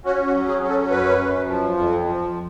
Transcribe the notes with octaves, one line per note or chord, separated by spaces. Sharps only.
C#4 F#4
F#4
F#3
G#4
C#4
A4
F#2 B4
F#2
F3
F2
F3